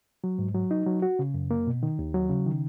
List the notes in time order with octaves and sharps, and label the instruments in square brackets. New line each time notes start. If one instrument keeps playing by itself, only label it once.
[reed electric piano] F#3
G#2
F#3
D#4
F#3
F#4
C#3
F#2
A#3
B2
D#3
D#2
F#3
C#3
D#3